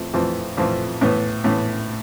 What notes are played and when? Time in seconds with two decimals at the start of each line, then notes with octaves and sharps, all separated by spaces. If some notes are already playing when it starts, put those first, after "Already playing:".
Already playing: F2 E3 A3 C4 F4
0.13 F2 E3 A3 C4 F4
0.57 F2 E3 A3 C4 F4
1.01 A2 E3 B3
1.44 A2 E3 B3